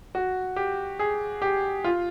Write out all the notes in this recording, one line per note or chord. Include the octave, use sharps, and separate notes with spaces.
F#4
G4
G#4
G4
F4